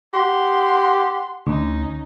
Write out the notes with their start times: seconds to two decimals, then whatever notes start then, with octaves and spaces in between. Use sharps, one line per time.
0.14 G4 F#5 C6
1.47 D2 C#4 D#4